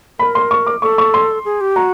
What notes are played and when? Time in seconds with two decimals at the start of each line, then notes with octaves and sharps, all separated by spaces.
0.19 A#4 B5
0.35 C6
0.51 C#6
0.67 D6
0.82 A4 C#6
0.98 C#6
1.14 C6
1.45 G#4
1.61 G4
1.76 F#4 A#5